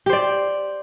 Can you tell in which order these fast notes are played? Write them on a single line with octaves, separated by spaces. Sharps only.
G4 C5 D5